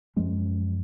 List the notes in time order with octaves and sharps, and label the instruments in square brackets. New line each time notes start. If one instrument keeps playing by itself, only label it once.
[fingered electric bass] F#2 F3 G#3 C#4